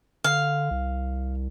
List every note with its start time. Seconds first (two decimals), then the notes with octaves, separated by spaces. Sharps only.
0.24 D3 F5
0.71 C2